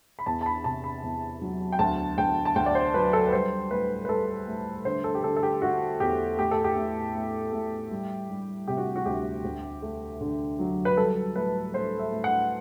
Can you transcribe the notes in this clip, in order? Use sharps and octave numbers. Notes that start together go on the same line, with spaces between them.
B5
E2 A5
A5
B5
C3 A5
B5
E2
F#3
G5
D2 A5
D2 G5
A5
D2 G5
D5
C5
F#3 B4
A4
B4
G3 C5
A2 B4
B4
G3 A4
A2
D3 C5
A4
G4
D3 A4
A4
G4
A3 F#4
E2 G4
A2 G4
A4
G4
A2
A2
A2
G3
G3
C3 G4
F#4
F#4
D2 G4
D2
A3
D3
F#3
B4
G3 A4
A2 B4
A2 C5
E5
A2
F#5